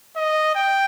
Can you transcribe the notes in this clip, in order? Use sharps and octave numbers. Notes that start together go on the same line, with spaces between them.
D#5
G5